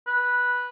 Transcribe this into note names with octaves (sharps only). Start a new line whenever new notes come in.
B4